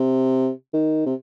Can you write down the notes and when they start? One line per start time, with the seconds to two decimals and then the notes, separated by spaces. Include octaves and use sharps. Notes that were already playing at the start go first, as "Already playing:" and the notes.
Already playing: C3
0.74 D#3
1.06 C3